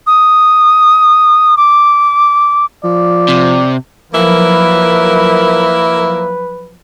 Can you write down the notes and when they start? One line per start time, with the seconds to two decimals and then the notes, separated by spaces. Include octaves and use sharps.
0.07 D#6
1.57 D6
2.84 F3 D5
3.28 C3
4.14 F3 F#3 A#3 E4 A#4 B4